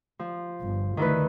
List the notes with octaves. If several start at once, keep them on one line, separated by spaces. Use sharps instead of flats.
F3
G1
D2 D#3 E3 B4